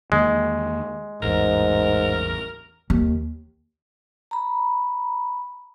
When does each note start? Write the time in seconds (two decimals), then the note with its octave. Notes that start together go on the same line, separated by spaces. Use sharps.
0.12 E2 D#3 G#3 A#3
1.23 A1 E2 G#2 A#4
2.90 D#2
4.31 A#5 B5